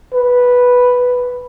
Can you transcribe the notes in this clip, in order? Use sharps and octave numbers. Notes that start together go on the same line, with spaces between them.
B4